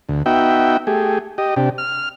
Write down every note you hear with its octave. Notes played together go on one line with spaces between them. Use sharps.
D2
B3 D#4 F#4 E5 G5
A3 G4 G#4
G4 D#5
C3 D4 G4
F6